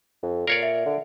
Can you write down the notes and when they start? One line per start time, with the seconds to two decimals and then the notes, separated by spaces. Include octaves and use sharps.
0.23 F2
0.47 A#2 A#4 C#5 D5 C7
0.62 E5
0.86 D3